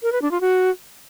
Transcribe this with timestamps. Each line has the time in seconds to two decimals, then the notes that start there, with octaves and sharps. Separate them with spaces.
0.03 A#4
0.12 B4
0.22 D4
0.31 F4
0.41 F#4